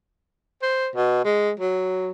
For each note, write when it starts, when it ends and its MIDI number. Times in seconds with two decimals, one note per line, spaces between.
0.62 0.89 72
0.96 1.20 47
1.25 1.52 56
1.60 2.12 54